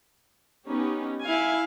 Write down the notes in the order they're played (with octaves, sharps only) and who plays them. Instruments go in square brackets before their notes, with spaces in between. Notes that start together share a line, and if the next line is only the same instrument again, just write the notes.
[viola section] B3 C#4 D#4 G4
E4 F5 G#5